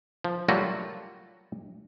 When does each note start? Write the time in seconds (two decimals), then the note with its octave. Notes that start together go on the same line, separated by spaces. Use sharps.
0.24 F3
0.48 F#3 G3 A3 A#3 F4 F#4